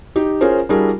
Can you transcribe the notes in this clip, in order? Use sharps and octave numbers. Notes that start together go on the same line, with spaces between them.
D#4 G4
C#4 F4 G#4 A#4 C5
G3 D4 E4 F#4 G#4 A#4